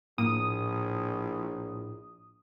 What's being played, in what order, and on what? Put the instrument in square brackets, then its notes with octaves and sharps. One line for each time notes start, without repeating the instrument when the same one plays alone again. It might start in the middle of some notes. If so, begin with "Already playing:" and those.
[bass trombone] A#1 [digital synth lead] A2 [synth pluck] A#3 [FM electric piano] D#6